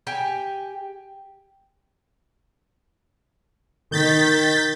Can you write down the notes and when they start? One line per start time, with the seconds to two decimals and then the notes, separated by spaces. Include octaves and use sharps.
0.07 G4 G5 G#5
3.92 D#3 G6 A6 B6